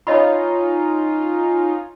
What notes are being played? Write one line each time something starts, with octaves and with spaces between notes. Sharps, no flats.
C#4 D#4 F4 C#5 D#5 B5